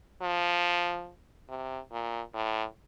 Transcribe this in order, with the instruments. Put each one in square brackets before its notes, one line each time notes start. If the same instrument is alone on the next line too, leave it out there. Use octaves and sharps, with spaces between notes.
[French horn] F3
C3
A#2
A2